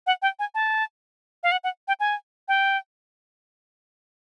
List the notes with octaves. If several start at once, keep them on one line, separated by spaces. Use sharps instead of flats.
F#5
G5
G#5
A5
F5
F#5
F#5
G5
G#5
G5